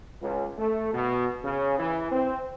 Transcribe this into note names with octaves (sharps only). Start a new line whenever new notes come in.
C#2
A3
B2
C#3
E3
C4